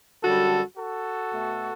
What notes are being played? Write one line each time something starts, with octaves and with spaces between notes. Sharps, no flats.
F#2 D3 G3 F#4 A4
F#4 A4
B2 A3